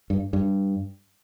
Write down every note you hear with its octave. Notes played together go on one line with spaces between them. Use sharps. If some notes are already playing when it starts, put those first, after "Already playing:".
G2
G2